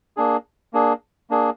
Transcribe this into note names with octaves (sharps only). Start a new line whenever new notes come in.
A#3 D4 G#4
A#3 D4 G#4
A#3 D4 G#4